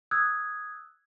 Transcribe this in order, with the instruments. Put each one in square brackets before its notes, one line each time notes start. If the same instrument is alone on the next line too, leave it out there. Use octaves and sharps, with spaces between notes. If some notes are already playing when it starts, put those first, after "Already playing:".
[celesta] D#6 E6 F#6 G#6